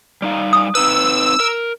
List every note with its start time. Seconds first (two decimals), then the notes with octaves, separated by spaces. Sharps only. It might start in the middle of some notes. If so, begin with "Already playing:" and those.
0.22 G3 D#4 F5
0.53 A5 D#6
0.75 C4 D#4 B4 E6
1.40 A#4